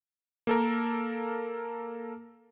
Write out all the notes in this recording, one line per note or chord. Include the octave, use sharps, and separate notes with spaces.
A#3 A4 A#4